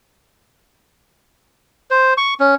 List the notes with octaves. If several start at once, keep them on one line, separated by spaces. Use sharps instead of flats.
C5
C#6
C#4